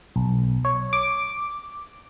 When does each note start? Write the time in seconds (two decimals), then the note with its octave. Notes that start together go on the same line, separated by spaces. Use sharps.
0.16 B1
0.65 C#5
0.93 D6